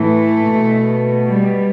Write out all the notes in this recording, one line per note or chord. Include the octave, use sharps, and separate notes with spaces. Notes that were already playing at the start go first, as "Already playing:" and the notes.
Already playing: A2 E3 A3
B2
G3